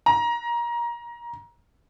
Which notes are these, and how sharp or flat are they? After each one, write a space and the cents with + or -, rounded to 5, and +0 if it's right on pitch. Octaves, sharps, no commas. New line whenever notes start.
A#5 +20